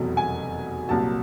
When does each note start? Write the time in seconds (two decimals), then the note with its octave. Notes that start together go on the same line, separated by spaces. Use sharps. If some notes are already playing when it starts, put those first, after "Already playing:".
Already playing: F1 E2 B2 F#3
0.17 G#5
0.89 C2 A#2 F#3 A5